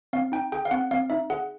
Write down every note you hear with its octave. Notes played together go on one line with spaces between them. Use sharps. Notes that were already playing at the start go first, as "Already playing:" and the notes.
C4 F5
D#4 G5
G#4 G5
F5
C4 F#5
C4 F5
D#4 E5
G#4 F#5